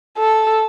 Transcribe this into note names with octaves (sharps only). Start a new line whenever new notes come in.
A4